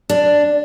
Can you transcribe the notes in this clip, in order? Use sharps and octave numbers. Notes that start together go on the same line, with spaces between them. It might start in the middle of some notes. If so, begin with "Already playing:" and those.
D4